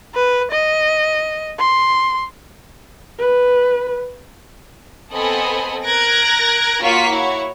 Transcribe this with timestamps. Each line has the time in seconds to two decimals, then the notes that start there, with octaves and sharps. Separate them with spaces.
0.15 B4
0.52 D#5
1.60 C6
3.18 B4
5.12 B3 C4 A4 D#5 G#5 B5
5.83 A#4 F#6 G#6 A#6 D7
6.82 A#3 F4 F#4 C#5 C#6 B6
7.10 E4 F#4 C#5